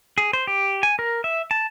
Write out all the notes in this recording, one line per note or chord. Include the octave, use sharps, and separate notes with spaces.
G#4
C5
G4
G#5
A#4
E5
A5